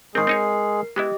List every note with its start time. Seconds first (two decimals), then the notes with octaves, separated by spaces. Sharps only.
0.15 G#2 D#3 G#3 C4 G#4 A#4 C7
0.27 C4 D#4 C#5
0.96 G#3 B3 E4 G4 D#5